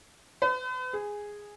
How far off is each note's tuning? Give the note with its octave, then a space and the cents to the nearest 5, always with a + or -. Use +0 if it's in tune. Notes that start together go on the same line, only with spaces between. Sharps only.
B4 +45
G#4 -5